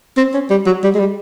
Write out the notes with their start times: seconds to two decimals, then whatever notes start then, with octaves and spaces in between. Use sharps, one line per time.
0.17 C4
0.34 C#4
0.50 G3
0.66 F#3
0.83 G3
0.94 G#3
0.99 G3